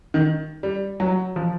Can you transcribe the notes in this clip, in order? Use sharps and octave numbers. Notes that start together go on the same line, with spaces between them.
D#3
G3
F#3
F3